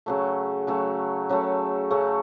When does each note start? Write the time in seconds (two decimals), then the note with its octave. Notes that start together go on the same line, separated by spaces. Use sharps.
0.06 C#3 F#3 A3
0.67 C#3 F#3 A3
1.29 C#3 F#3 A3
1.91 C#3 F#3 A3